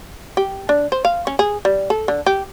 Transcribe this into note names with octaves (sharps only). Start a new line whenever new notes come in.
G4
D4
C5
F5
C#4
G#4
G3
A4
D3
G4